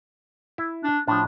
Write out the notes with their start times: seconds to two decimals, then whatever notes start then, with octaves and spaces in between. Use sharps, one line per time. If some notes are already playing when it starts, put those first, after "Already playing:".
0.58 E4
0.84 D4
1.08 A2 F3 D4